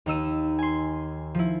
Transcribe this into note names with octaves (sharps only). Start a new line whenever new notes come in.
D#2 D#4 E6 D#7
G#5 C6
F3 E4